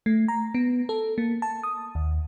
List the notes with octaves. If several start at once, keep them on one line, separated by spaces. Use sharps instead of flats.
A3
A#5
B3
A4
A#3
A5
D#6
D#2